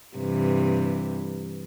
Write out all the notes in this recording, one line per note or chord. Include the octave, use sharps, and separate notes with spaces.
G2 C3 E3